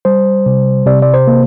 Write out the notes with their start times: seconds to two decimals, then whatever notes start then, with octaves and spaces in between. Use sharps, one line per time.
0.05 G3 C5
0.46 C3
0.86 C3 D5
1.02 D5
1.14 C5
1.27 A#3